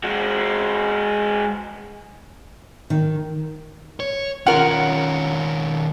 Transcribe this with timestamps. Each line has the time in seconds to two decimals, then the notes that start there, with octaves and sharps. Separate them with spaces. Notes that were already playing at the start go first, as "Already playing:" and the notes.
0.04 G#3 F#4
2.90 D#3
4.00 C#5
4.47 D#3 C#4 F4 A#4 C#5 F#5